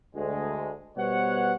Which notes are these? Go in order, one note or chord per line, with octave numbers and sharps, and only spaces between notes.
D2 G#3
B2 G3 B3 C5 C#5 F#5